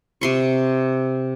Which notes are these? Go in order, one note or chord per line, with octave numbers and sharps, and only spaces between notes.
C3 C6 C#6